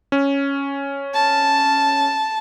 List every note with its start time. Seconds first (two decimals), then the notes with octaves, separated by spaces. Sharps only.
0.12 C#4
1.14 A5